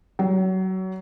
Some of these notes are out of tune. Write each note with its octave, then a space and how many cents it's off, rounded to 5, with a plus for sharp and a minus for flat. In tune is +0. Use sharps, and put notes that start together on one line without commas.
F#3 +25